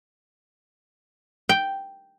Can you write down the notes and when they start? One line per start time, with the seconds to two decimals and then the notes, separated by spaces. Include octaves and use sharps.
1.49 G5